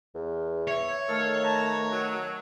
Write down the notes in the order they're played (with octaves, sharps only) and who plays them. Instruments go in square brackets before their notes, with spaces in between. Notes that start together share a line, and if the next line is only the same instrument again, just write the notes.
[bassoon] E2
[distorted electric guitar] C#5 [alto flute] E5
[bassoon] D#3 [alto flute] A3 [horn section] A4 F5
[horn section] B4 A5 A#5
F#3